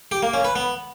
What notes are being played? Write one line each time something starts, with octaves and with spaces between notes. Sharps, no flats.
G4
A#3
C#4
B4
B3